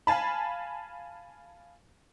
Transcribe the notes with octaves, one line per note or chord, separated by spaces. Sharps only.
F5 G#5 A5 B5